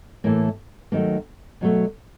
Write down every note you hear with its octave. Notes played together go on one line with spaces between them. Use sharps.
A2 E3 A3 A#3
D#2 D#3 F#3 A3 A#3
B2 F#3 A3